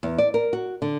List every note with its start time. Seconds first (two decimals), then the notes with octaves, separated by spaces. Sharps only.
0.03 E2
0.18 D5
0.34 A#4
0.53 F#4
0.82 D3